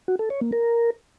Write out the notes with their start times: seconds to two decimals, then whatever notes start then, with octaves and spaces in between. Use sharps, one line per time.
0.08 F#4
0.19 A4
0.30 C#5
0.41 A#3
0.52 A#4